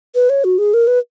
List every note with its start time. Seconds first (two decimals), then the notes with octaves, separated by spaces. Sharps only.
0.15 B4
0.29 C#5
0.44 F#4
0.58 G#4
0.74 A#4
0.87 B4